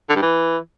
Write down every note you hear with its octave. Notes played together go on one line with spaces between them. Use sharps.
D3
G2
E3